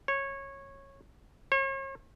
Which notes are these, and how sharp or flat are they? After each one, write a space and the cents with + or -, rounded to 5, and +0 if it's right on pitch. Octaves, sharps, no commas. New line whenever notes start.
C#5 -15
C#5 -40